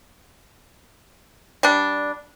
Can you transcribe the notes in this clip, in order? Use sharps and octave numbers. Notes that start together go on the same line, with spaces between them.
G3 D4